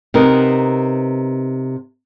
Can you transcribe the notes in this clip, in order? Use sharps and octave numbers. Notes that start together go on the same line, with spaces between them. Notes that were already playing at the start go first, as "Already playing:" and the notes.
C3 B3 D#4 A#4